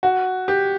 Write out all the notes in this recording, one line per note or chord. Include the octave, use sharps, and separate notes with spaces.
F#4
G4